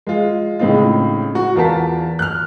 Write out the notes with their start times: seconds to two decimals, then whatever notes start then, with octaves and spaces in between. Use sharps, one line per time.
0.07 G#3 F4
0.59 A2 C#3 G#3 C4 D#4 F4
1.35 F#4
1.55 E2 F4 A#4 B4 A5 B6
2.19 F6 F#6